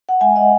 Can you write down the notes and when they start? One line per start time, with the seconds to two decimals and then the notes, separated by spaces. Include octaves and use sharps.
0.09 F#5
0.20 G#3 E5 G#5
0.36 D#5 F#5